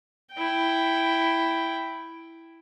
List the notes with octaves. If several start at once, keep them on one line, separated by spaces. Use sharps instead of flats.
E4 G5